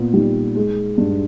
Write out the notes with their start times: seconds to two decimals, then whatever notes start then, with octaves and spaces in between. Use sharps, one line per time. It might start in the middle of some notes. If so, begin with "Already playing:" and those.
Already playing: A#2 B3
0.14 G3 D#4
0.55 G#3
0.98 G2